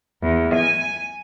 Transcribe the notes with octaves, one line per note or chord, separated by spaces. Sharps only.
E2
G#5